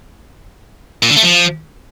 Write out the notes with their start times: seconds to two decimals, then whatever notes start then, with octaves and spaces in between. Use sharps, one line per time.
1.03 A#2
1.09 D3
1.16 A3
1.23 F3